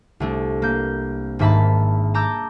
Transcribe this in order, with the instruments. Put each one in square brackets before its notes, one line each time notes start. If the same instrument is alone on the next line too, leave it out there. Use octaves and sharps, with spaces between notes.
[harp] C2 A3 D4
A#3 G6
G#1 G#2 A#3 E5 A5 B5
A5 A#5 D6 E6 G6